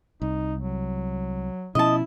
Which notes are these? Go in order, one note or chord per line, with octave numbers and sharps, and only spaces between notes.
C2 D#4
F#3
B2 F3 C#4 E4 D#5 A5